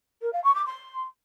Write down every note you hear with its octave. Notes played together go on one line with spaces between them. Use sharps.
A#4
F5
C#6
D6
C6